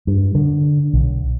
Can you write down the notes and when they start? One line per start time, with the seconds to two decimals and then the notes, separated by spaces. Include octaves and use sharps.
0.07 G2
0.35 D3
0.93 B1